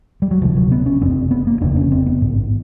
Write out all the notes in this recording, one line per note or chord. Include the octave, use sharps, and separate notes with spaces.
G3
F#3
E1 D2 C3 F3
F#3
B3
C#4
F#1 E2 C3 C4
B3
A#3
F1 E2 C#3 D4
C#4
C4
B3
A1 G#2